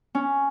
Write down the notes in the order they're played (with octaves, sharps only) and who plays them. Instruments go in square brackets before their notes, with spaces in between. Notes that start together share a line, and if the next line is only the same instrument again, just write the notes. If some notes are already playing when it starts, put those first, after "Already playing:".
[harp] C#4